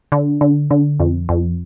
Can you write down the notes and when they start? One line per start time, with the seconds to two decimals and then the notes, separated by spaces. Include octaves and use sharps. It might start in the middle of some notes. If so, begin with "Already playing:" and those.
0.12 D3
0.41 D3
0.71 D3
1.00 F2
1.29 F2